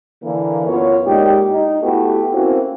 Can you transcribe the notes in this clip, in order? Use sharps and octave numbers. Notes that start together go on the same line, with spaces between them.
D3 E3 A#3
F#2 B3 F4 C#5
A#2 G#3 A#3 D#4 G4
D#4
A3 B3 E4 F#4 G4
A#3 C4 C#4 E4 F#4